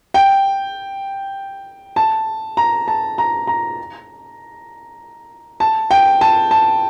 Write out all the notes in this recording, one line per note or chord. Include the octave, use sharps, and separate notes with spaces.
G5
A5
A#5
A5
A#5
A#5
A5
G5
A5
A5